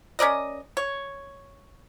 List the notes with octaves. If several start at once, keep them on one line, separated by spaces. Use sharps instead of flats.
C#4 A#4 D5 D#5
C#5